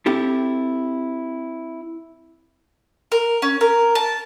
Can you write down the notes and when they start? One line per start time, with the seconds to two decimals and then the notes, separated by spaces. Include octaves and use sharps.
0.06 C4 E4 G4 A4
3.12 A#4
3.42 C#4
3.61 A#4
3.95 A5